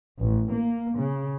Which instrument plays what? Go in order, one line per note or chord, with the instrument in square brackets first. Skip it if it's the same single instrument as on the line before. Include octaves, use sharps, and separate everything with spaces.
[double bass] A1
A#3
C#3